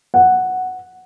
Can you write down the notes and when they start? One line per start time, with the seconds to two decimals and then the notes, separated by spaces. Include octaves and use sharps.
0.14 F#5